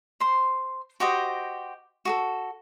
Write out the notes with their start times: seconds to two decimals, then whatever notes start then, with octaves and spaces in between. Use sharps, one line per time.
0.20 C5 C6
1.00 F#4 G4 C5 D#5
2.05 F#4 G#4 A4